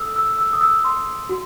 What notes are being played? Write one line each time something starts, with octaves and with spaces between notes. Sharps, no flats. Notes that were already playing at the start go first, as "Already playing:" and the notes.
Already playing: A4 D#6 E6
E6
E6
D#6
E6
C6
F#4